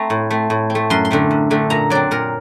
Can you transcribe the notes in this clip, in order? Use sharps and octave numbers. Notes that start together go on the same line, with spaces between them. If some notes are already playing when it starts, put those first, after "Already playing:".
Already playing: A3 C4 A#5
A2
A3 C4
A2
C4
A3
F#2 C6
C6
D3 A3 C4
F#2
D3 A3 C4
A#2 A#5
F#3 C4 D5
A#2 A#4